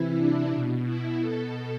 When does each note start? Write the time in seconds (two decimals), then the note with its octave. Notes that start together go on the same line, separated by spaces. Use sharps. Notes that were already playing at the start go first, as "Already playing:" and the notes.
Already playing: C3 E3 E4
0.17 D4
0.51 B2
0.85 E4
1.19 B2 A4